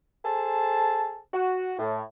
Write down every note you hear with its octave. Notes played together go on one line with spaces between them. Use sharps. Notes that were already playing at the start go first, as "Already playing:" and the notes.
G#4 A4 C5 A5
F#4
A2